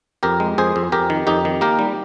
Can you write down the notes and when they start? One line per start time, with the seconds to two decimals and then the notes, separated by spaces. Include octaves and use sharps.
0.23 F2 G4 A#4
0.40 G#3
0.58 F2 G#4 C5
0.76 F2
0.92 F2 G4 A#4
1.10 D#3
1.27 F2 D#4 G4
1.45 D#3
1.61 A#3 G4 A#4
1.79 G3